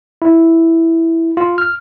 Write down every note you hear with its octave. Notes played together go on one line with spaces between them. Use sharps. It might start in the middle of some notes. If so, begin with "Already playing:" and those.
E4
F4
F6